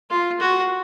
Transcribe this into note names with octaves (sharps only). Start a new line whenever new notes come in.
F4
F#4